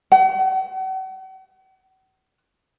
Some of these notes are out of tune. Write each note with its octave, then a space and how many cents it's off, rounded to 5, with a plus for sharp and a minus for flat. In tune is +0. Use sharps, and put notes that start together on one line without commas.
F#5 +40